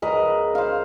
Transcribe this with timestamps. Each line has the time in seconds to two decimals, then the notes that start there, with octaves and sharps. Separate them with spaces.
0.02 C#2 A#4 B4 D#5
0.55 C5 F5